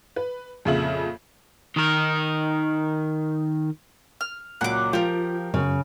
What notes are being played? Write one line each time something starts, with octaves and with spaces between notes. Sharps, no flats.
B4
F2 A#2 C#3 F4 E5 F#7
D#3 A#4
F6
C#2 A#2 F#3 F#5 D6
F3 F4 G4 A#4 D7
F#2 C#3 C#5